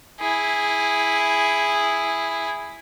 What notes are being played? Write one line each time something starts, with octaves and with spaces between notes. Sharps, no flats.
E4 G#4